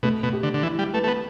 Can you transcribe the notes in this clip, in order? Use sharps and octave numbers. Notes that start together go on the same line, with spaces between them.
B2 A3
B2
G4
D3
D3
E3 E4
G3
A3 B4
A3
B3